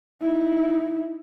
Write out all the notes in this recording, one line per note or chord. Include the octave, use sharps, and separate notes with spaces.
D#4 E4